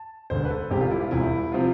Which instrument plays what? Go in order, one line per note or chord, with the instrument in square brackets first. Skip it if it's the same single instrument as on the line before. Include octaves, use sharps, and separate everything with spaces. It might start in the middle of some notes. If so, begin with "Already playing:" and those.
Already playing: [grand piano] A5
E1 D2 D3 C5
B4
A4
E1 E2 C3 G3 G4
F4
E4
F4
E1 E2 C3 G3 E4
C3 F3 C4 F4